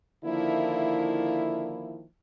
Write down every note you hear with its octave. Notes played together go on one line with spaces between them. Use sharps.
D3 D#3 F3 A#3 E4